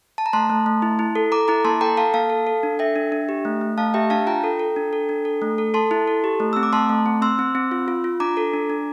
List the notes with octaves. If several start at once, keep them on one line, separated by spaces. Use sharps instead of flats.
A5
A#5
A3 A5 C6
A3
A3
E4
E4
A4
A4 A#5 D6
E4 A#5 D6
A#3 A5 C6
A4 G5 A#5
A4 F5 A5
A#3 F5 A5
A4
A4
D4
A4 E5 G5
D4
D4
G4
A3
A3
A3 F5 A5
G4 E5 G5
D4 F5 A5
F4 G5 A#5
A4
A4
D4
A4
D4
A4
A3
A4
A4 A5 C6
E4
A4
G4
A3
C4 E6
D6
A3 A5 C6
A3
C4
C4 C6 E6
C4
C4
F4
F4
F4
D4 A#5 D6
A4
D4
D4